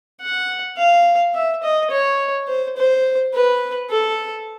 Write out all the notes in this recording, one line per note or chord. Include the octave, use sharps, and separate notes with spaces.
F#5
F5
E5
D#5
C#5
C5
C5
B4
A4